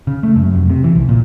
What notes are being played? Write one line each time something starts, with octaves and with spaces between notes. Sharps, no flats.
C#3
A3
F#2
F1
C3
E3
C2
A#2